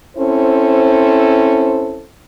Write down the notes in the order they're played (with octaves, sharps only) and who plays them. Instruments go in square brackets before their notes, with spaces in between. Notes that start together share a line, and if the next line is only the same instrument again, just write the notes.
[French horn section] C4 C#4 E4 A4 C5